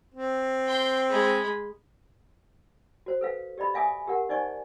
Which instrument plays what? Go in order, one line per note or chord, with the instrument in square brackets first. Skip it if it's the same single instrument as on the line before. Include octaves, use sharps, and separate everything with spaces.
[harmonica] C4
[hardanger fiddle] G5 C6
G#3 B5
[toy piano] F#4 C5
A4 B4 F5
G4 D5 D#5 B5
E5 F5 G#5 D6 D#6
G4 A#4 F#5
D#4 C5 D5 D#5 G#5 C#6